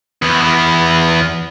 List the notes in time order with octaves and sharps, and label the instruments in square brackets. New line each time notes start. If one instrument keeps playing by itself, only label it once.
[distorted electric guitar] E2 B3